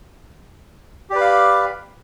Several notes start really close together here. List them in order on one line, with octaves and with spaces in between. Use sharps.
G4 D5 B4 B5 F5